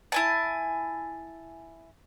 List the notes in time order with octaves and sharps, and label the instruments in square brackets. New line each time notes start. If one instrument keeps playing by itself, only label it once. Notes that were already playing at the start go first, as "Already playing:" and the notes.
[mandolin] E4 G#5 A5